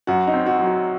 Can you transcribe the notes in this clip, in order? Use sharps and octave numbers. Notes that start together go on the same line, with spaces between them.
F#2 F#4
D#4
C4
F#4
F#3
F#4